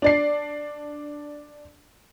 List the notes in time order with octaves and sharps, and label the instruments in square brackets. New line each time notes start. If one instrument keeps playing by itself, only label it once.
[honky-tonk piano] D4 D5 C7